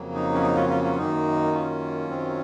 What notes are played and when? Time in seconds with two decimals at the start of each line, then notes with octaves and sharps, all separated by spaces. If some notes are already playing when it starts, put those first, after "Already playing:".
Already playing: F2 C#3 F#3 A#3
0.14 D#4
0.34 C#4
0.42 D#4
0.56 C#4 F4
0.69 C#4 F4
0.84 C#4 F4
0.98 F#2 D#3 A#3 D#4
1.53 C#4 F4
2.09 F#2 D#3 F#3 C4